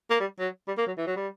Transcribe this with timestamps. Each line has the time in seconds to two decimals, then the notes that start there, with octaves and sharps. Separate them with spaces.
0.10 A#3
0.20 G3
0.39 F#3
0.68 G3
0.78 A#3
0.87 F#3
0.98 E3
1.07 F#3
1.16 G3